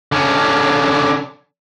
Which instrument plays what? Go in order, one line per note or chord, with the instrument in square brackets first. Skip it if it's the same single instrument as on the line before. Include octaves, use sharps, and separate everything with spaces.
[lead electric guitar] D3 C#4